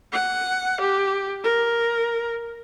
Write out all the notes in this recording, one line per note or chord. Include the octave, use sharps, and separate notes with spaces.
F#5
G4
A#4